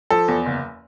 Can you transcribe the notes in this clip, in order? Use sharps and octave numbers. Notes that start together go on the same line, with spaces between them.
F3 A4
E2
F#1